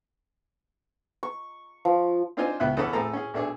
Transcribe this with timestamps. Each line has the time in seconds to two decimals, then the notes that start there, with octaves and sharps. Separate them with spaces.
1.23 C#6
1.85 F3
2.37 C4 D4 D#4 F4 C5 G#5
2.60 C#2 B3 E4 E5 F#6
2.77 E2 C#4 A4 F#5 B5
2.93 A2 C4 G#4 A4 A#5
3.13 C#4 G#4
3.34 B1 A3 D4 G#4